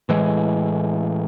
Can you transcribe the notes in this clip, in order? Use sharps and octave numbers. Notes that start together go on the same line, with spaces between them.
A2 E3 G#3